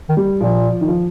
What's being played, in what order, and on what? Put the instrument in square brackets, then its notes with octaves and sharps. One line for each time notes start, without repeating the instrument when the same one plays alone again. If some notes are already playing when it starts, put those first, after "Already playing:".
[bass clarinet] D#3
[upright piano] G3
[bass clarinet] A#2 [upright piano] F3
[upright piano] D#3
F3